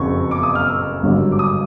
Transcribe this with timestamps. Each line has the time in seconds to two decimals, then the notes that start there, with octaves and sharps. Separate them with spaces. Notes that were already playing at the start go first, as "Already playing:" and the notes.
Already playing: F#1 F2 C#3 F#3 C#6
0.31 D6
0.43 D#6
0.55 F6
0.67 E6
1.03 G#1 G2 D3 F#3
1.32 D6
1.39 D#6